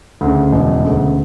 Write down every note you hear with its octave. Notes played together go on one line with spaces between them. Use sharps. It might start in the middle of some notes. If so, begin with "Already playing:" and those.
D2 C#3
E1
D2 C#3